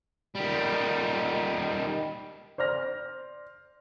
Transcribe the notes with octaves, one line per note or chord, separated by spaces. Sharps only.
D#3 G3
C5 D5 F6 A#6